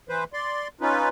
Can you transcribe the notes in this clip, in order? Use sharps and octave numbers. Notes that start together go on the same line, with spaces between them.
E3 B4 C5
D5 C6
C#4 D#4 F4 B4